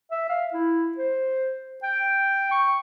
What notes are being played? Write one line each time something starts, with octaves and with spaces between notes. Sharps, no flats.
E5
F5
E4
C5
G5
C#6